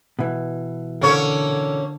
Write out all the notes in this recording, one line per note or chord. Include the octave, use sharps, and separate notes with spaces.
B2 E3
D3 A#3 C#4 C#5